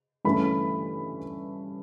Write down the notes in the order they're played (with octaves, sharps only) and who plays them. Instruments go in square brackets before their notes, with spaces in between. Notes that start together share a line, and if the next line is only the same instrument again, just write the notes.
[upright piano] G2 E3 A3 C#4 B5